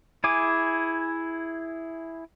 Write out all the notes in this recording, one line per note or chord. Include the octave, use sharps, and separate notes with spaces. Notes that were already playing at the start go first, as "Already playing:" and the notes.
E4 G#4 G#5 D6